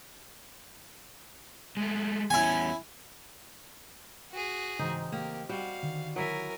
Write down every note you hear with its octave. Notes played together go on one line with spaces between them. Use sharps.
G#3 A3
E2 C#4 E4 G#5
F#4 G#4
G#2 C#3 E3 C4 D#4
A#3 G4
G3 F#4 F5
D3 D#3
F#3 E4 A#4 E5 G#5